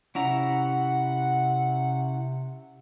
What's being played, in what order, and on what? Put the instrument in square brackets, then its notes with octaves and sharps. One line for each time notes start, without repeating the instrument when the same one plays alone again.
[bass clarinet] C3 [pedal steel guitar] C#4 E4 A#5 [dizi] F#5